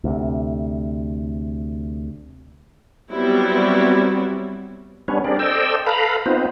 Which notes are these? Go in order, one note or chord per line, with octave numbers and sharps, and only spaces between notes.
D2 C3
F#3 G3 B3 C4 E4
G3 B3 C#4 D4 B4 C#5
C4 D4 G4 G#4 A#4 D5
A4 C5 D5 D#5 G5 E6
A4 B4 F5 A#5 B5
B3 C4 D#4 F4 B4 C5